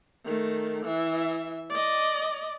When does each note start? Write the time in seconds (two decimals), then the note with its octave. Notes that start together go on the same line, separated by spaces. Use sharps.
0.24 D#3 A3
0.85 E3 E5
1.70 D5 D#5